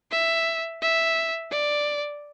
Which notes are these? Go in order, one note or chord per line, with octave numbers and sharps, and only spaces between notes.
E5
E5
D5